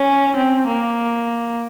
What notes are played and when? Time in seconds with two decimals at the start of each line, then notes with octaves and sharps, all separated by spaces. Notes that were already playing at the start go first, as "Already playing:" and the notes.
Already playing: C#4
0.36 C4
0.67 A#3